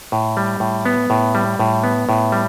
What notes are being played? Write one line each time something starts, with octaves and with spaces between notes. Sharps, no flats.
A2
G3
A2
B3
A2
G3
A2
B3
A2
G3